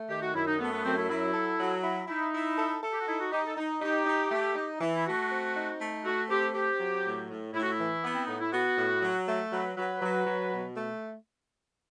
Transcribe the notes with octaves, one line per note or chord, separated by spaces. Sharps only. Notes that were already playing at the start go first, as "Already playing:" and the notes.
Already playing: A3
D#3 G4
F#4
F#2 E4
D#4
A3 B3
B3
F#2 C4
E4
F#3 E4
A4
F#3
E4
D#4 E4
E4
A4
A4
G4
F#4
D#4 E4
F#4
D#4 G4
A4
D#4
D#4 G4
D#4
A3
D#4
E3
E4
A3 F#4
C4
D#4
A3
A3 F#4
C4 G4
C4 G4
F#3
A2
A2
A2 E4
F#4
E4
E3
B3
C4
A2 D#4
E4
B3 F#4
A2
F#3
A3
F#3 B4
F#3 B4
F#3
F#3
B2
A3